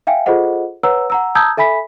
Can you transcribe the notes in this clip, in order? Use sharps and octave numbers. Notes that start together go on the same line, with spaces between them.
E5 F5 G5 G#5
F4 G#4 A4 C5 D#5 F#5
B4 C#5 F#5 A#5 E6
F#5 A#5 E6
A5 A#5 D#6 E6 G6 G#6
A4 E5 G#5 B5 B6